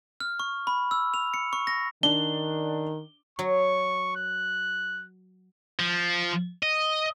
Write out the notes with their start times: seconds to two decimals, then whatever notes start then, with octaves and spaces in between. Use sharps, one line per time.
0.20 F6
0.40 C#6
0.67 B5
0.91 E6
1.14 F7
1.34 C#7
1.53 C#6
1.67 A#6
2.03 D#3 D4 G7
3.39 F#3 C#6
4.16 F#6
5.79 F3
6.63 D#5